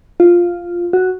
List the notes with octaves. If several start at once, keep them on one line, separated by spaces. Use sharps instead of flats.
F4
F#4